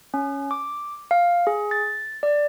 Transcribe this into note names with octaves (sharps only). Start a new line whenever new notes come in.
C#4
D6
F5
G#4
A6
D5